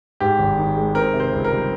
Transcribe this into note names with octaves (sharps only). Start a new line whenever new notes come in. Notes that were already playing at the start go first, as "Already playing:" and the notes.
G#2 G4
G#1
D#3
G#3
C4 A#4
C3
C5
C#2
A#4
G3